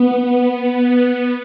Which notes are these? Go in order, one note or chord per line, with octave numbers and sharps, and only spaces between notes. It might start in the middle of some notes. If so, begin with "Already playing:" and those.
Already playing: B3